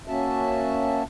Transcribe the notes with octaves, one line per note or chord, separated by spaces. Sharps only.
A#3 C#4 F#4 E5 A5